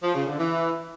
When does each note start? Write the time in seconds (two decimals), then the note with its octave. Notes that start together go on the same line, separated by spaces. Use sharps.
0.03 F3
0.15 C#3
0.27 D3
0.39 E3